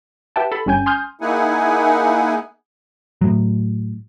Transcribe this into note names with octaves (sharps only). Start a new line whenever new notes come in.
G4 B4 E5 F#5 G5 A5
A4 B5
G1 G3 C#4 G5 G#5 G6
G#5 C6 D#6 F6 G6
A#3 D#4 E4 G#4 F#5 G#5
A2 F#3